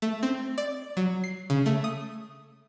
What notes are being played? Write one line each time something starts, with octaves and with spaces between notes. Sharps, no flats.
A3
C4
D5
F#3
C7
C#3
A3
D#6